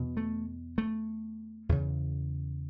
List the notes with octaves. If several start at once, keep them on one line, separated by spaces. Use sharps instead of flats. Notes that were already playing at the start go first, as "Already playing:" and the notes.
Already playing: E2 B2
A3
A3
E2 C#3